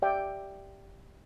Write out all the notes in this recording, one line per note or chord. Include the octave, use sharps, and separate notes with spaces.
G4 D5 E5 G5